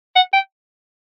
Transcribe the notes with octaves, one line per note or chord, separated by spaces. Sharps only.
F#5
G5